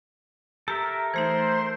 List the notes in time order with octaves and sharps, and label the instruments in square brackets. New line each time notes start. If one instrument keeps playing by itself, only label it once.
[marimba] G4 [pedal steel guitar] A4 A#4 E5
[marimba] E3 A3 D#4 [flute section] C5